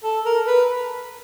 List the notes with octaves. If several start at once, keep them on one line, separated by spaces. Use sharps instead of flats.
A4
A#4
B4